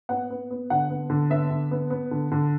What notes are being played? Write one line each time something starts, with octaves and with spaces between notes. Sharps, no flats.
B3 F#5
B3
B3
D3 F#5
B3
D3
B3 E5
D3
B3
B3
D3
D3